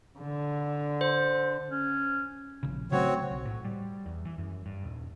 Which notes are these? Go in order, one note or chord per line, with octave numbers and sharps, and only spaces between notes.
D3
C5
C#4
A#1 C#3
C#3 F#3 A3 C4 F#4 C#5
B1
A2
G3
E2
E3
F#2
G2
D#1